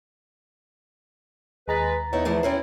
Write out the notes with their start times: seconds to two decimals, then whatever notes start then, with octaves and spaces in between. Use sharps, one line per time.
1.68 D#2 G#3 B4 A#5 A6
2.13 B3 D#4 E4 C#5
2.25 E2 E3 F3 A3 E4
2.43 B2 E3 C4 C#4 E4 C5